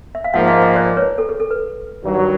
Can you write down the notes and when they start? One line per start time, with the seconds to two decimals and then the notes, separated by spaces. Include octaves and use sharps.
0.15 E5
0.24 F5
0.34 G#2 F3 A#3 E5 F#5
0.48 D#5 F5
0.62 D#5 F5
0.75 C5 D5
0.97 B4 C#5
1.18 A4
1.29 G#4
1.40 A4
1.51 B4
2.03 G2 D#3 F#3